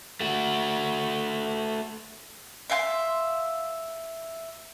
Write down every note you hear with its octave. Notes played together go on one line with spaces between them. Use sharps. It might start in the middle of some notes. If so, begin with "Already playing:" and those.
A3 F#4
E5 F5 G5 C6